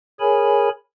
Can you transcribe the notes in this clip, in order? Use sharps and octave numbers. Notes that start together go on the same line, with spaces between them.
G#4 A#4 C#5 G#5 B5